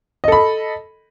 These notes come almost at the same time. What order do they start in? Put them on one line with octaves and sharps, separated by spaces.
D#5 A4 B5